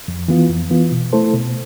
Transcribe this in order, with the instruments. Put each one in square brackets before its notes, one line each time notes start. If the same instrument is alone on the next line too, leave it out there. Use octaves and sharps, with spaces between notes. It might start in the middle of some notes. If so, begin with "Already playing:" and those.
[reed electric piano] F2
E3 B3 F4
F2
E3 B3 F4
B2
A3 E4 A4 C5
B2